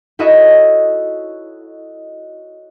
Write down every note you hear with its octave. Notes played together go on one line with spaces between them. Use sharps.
E4 F#4 A4 C#5 D#5 E5